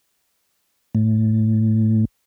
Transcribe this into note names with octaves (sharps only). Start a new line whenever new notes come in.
A2